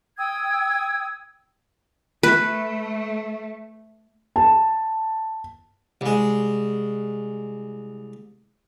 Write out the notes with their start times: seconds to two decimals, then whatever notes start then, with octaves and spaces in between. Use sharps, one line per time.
0.17 G5 D#6 E6 G#6
2.23 A3 B4
4.36 A5
6.01 C2 G#3